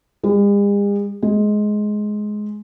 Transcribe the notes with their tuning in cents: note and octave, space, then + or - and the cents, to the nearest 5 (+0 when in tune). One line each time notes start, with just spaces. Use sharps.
G#3 -45
G#3 +15